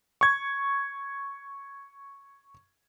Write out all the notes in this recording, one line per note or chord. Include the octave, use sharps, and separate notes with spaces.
C#6 G#6